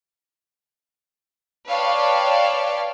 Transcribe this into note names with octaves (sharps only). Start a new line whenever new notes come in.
B4 C#5 D5 F5 G5 A5